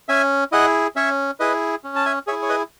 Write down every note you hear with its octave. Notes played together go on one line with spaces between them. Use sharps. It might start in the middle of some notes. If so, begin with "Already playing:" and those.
C#4 E5 G#5
E4 G#4 D#5 F#5
C#4 C#5 E5
E4 G#4 B4 D#5
C#4
A5
E5 G#5
E4 G#4 C#5 E5
C#5
B4 D#5